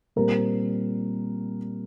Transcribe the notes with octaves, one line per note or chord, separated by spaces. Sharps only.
A#2 G3 C4 A#4